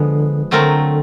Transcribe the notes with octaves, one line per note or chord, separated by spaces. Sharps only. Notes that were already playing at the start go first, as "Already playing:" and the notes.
Already playing: D3 F3 G#3 B3
D3 F#3 A3 C4 F4 A#4